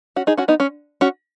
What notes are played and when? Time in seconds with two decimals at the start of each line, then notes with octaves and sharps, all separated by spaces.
0.16 C#4 F#4
0.27 D#4 G#4
0.37 C#4 F#4
0.48 B3 D#4
0.60 C#4
1.01 C#4 F#4